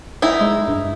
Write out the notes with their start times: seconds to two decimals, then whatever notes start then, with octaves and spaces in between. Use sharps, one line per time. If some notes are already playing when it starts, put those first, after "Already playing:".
0.22 D#4 E4
0.41 G#3
0.68 G2